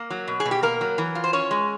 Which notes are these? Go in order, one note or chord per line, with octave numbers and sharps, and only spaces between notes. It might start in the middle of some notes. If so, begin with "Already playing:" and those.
Already playing: A#3
F#3
B2
G#4
B2
G4
A#3 A#4
F#3
E3
F4
C5
C#4 C#5
G#3